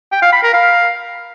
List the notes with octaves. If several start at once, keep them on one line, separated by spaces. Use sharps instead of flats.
G5
F5
B5
A#4
F5